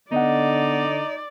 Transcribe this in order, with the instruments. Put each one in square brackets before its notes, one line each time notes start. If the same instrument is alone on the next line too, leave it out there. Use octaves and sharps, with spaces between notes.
[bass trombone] D3 [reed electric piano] B3 D#5 F#5 [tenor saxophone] D#4 [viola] D5